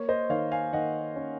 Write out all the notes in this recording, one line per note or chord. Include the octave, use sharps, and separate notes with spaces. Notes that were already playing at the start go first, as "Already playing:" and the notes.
Already playing: A#3 C#5
C5 D#5
D#3 C#5 F5
F5 G#5
D#3 D#5 F#5
C#4